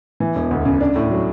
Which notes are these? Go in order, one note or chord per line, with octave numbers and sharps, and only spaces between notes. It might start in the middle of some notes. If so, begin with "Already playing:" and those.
E3
E1
D2
C#3
D4
A2
F#3